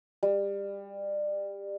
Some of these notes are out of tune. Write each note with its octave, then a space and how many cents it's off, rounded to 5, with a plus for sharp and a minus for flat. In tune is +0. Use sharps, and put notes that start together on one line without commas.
G3 +25